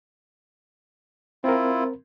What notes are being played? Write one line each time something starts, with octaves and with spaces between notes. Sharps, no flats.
C4 E4 F4 A#4